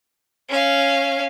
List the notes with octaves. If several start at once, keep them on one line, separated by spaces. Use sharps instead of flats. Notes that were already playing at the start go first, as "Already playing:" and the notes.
C#4 F5